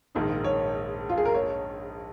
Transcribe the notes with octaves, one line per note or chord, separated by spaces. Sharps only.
A#1 G#2 D#3 A#3 D#4
C#5
F4
G#4
A#4
C#5